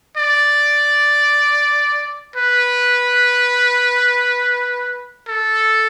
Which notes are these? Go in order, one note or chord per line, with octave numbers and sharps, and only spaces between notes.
D5
B4
A4